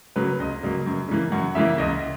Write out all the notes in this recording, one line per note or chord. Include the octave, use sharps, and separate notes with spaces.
C#3 F#3 A#3 B4
C#2 D#5
C#3 F#3 A#3
F#2
C#3 E3 A#3
F#2 F#5
C#3 E3 A#3 E5
C#2 D#5